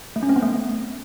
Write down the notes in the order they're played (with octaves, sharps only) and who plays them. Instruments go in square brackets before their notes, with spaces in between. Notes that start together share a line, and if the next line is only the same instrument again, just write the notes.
[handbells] A3
C#4
C4
B3
A3